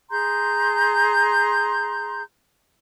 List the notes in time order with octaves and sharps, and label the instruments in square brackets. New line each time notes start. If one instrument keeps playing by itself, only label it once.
[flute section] G#4 A#5 C6 G6